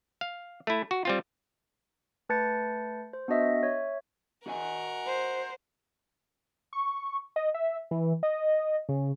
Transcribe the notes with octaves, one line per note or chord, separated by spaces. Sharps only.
F5
A3 E4
F#4
G3 C4 F4
A3 B4 A5 G6 A6 C#7
C5
B3 D4 F#4 D#5 E5
C#5 E5
F#4 A#4 D#5 F#5 G#5
C5
C#6
D#5
E5
E3
D#5
C#3